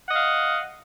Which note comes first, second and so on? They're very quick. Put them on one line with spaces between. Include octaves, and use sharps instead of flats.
F#5 D#5 F5